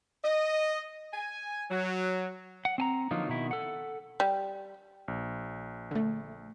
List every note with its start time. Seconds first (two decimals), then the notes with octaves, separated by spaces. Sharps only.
0.24 D#5
1.13 G#5
1.71 F#3
2.65 F#5
2.78 C4 G#5 A#5
3.11 D3 F3 F#3 A#3 D#4 F4
3.29 B2 D#3 E4
3.51 A4 F#5
4.20 G3
5.08 A#1
5.91 D3 A3